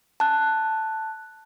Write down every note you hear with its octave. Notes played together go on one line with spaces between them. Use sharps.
A5 F#6